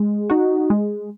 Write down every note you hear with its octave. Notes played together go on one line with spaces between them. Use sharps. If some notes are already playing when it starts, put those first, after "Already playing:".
Already playing: G#3
D#4 F#4
G#3